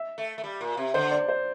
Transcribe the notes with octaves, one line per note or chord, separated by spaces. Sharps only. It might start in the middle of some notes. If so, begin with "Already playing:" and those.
Already playing: E5
A3
A3
G3
A#2
C3
D3 C5
D5
C5